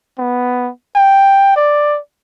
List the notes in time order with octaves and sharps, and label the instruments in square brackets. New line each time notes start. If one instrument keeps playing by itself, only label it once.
[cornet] B3
G5
D5